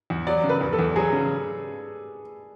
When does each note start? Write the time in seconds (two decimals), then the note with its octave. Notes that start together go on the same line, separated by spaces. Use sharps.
0.10 E2
0.27 F#3 D5
0.44 C#3
0.49 B4
0.61 E2
0.73 A4
0.79 E2
0.96 F#3 G#4
1.13 C#3